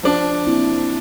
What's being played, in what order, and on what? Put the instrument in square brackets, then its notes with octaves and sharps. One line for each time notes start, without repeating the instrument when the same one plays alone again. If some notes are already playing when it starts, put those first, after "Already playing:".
[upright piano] F3 D4
[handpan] A#3 C4 E4